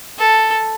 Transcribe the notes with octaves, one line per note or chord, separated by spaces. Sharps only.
A4